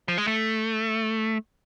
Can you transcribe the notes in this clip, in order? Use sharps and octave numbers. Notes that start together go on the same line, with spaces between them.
F3
G#3
A3